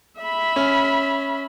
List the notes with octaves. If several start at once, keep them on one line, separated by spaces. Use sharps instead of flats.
E5 B5
C#4